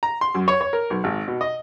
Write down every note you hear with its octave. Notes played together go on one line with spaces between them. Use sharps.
A#5
C6
F#2
C#5
C#5
A#4
B1
G#1
B2
D#5